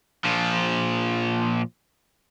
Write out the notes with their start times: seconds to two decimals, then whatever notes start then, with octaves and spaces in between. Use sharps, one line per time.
0.25 A#2 F3